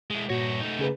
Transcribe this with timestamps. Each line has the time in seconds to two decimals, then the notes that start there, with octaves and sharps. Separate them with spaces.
0.10 G#3 E4
0.30 G2 A#2 F#4 C#5 A#6
0.61 A3 D#4
0.79 C#3 G#4 B4